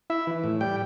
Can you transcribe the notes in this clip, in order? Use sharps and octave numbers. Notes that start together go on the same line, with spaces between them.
E4 E5
E3
A2
G3 G5